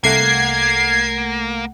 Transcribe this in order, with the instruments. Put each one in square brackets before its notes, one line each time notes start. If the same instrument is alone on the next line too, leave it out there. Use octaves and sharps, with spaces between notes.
[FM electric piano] C2 A3 F#5 [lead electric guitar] A#3 [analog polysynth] G#6 C7